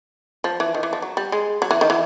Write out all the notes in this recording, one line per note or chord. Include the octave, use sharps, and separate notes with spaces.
F3
E3
D#3
E3
F3
F#3
G3
G#3
F#3
E3
D#3
E3